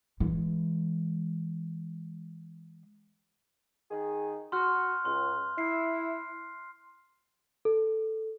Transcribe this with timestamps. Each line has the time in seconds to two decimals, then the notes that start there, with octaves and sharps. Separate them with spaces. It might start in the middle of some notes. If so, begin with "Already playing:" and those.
0.20 E3 G#3
3.91 D#3 G#4
4.52 F#4 C6 F6 F#6
5.05 C#2 C6
5.58 E4 C7
7.65 A4